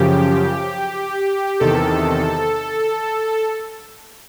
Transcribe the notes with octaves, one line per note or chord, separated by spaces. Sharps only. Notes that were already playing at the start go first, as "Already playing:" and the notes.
Already playing: F#2 C#3 F3 G4
E2 C3 D#3 A4